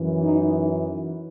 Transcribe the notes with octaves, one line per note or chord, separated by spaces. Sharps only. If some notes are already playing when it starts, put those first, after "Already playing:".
Already playing: F#2 E3
D#4